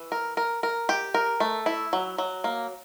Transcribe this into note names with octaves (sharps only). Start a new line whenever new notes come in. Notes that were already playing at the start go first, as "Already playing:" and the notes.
Already playing: E3
A#4
A#4
A#4
G4
A#4
A3
E4
F#3
F#3
A#3